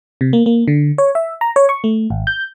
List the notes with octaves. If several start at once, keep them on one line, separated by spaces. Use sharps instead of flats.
C3
A#3
A#3
D3
C#5
E5
A#5
C#5
C#6
A3
G#1
G6